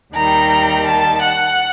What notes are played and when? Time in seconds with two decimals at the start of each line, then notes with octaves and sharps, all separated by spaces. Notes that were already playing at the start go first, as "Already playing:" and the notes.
0.14 D#2 D#3 G3 A#5
0.86 A5
1.21 F#5